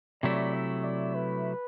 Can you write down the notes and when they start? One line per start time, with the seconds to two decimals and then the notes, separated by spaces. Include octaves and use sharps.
0.22 C3 F#3 A3 E4 D5
0.54 E5
0.84 D5
1.15 B4